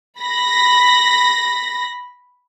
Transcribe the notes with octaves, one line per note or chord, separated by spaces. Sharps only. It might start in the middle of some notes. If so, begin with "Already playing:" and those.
B5 A#6